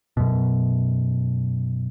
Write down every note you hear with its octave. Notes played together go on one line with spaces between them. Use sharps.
F#2 B2